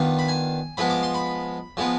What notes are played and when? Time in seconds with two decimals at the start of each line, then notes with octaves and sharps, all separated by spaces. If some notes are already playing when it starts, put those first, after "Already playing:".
Already playing: D#3 B3 D4 F4
0.19 B5
0.28 G#5
0.77 F3 G#3 B3 B5
0.90 D6
1.03 C6
1.14 B5
1.77 F3 G#3 B3